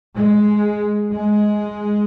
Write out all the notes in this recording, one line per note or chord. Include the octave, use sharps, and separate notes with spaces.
G#3
G#3